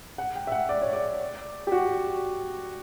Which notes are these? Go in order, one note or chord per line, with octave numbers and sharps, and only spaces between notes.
F#5
G5
E5
F#5
D5
C#5
D5
G4
F#4